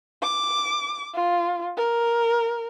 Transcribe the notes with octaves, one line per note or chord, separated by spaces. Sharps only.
D6
F4
A#4